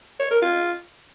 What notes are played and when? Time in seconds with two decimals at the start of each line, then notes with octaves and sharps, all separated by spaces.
0.20 C#5
0.31 A#4
0.42 F4